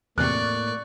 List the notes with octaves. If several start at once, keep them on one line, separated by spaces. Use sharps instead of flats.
E2 A2 C3 A#3 D5 C#6 F#6